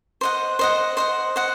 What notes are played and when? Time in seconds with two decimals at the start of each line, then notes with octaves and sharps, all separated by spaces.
0.21 C5 D#5 F#5
0.59 C5 D#5 F#5
0.97 C5 D#5 F#5
1.36 C5 D#5 F#5